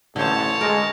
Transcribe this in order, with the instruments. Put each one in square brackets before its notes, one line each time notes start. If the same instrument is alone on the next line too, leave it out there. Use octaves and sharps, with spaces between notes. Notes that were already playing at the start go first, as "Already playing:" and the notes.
[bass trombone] A1 [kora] D3 C5 [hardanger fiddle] C#5 A5
[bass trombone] G#3 [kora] A#4